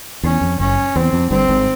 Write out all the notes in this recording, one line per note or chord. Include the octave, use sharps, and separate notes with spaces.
E2 C#4
F2
F#1 F#2 C#4
E2 C4
F2
G1 G2 C4
G#1 G#2